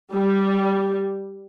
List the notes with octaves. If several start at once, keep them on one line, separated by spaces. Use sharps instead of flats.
G3